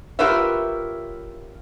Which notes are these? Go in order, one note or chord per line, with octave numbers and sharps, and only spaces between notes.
F4 G4 A#4 B4 C#5 E5